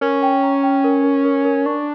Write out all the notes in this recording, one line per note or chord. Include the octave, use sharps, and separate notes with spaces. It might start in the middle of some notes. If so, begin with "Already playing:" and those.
C#4 A#4
G5
A#5
G5
A#4
A#4
A#4
A#4
D4 C#6